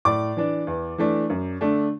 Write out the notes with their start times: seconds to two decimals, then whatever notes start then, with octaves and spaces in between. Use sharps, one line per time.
0.05 A2 D5 D6
0.37 E3 D4
0.67 E2
0.98 E3 A3 D4
1.30 F#2
1.61 D3 A3 D4